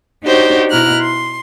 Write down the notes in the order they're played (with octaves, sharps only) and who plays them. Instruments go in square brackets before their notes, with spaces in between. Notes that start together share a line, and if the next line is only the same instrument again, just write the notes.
[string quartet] D4 D#4 F#4 G4 C5 C#5
B2 E4 A#5 F6 F#6
C6